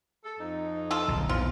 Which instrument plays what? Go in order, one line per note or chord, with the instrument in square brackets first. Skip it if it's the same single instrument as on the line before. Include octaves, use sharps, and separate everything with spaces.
[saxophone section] A4
F2 D#4
[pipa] F4 A4
[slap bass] D1 B1
[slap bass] B1 E2 [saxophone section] C4 [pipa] F4